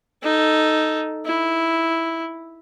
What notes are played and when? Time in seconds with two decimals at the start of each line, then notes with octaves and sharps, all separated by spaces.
0.23 D#4 A4
1.25 E4